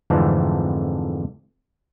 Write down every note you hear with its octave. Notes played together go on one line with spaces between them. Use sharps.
F2 G#2 D3 E3 A3 C4